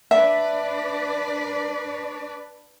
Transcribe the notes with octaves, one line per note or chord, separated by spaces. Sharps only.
D4 B4 D5 E5